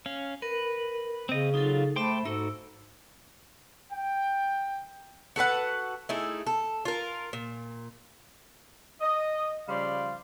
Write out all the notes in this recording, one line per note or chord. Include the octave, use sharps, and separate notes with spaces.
C#4 F5
A#4 B4
C#3 C4 D#5
F#3 D#4 F4 A4
A3 C5 E5 G5 B5 C6 D6
G#2 D#4 F#4 A4 E6
G5
F#4 A4 B4 F#5
A3 D#4 E4 G#4
A4
F4 A#4
A#2
D#5
C#3 F3 G3 D5 F5 C6